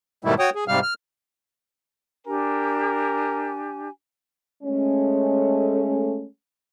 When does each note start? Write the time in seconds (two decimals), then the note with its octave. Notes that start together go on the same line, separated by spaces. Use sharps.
0.25 G#2 B2 D#3 G3 A3 E4
0.39 F#4 C#5 G5 D#6
0.55 G#4
0.68 G#2 C3 G3 F5 F6
0.83 F6
2.27 D4 G4 A#4 G#5
4.63 G#3 A3 C#4